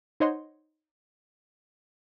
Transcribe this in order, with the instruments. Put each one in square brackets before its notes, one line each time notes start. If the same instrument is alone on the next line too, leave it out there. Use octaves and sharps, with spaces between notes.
[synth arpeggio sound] D#4 C5 C#5 D#5 F#5 C6